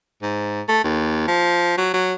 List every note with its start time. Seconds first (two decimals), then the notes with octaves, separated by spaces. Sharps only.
0.22 G#2
0.68 A3
0.84 D#2
1.28 F3
1.78 F#3
1.94 F#3